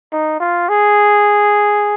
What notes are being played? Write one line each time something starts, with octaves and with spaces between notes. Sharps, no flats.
D#4
F4
G#4